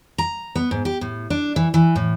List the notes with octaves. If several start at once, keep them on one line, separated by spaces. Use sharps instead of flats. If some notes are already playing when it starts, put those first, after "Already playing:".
A#5
B3
G#2
G4
A2
D4
E3
E3
A2